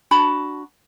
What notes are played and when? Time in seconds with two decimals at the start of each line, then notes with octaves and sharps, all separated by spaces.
0.11 D4 F#4 A5 B5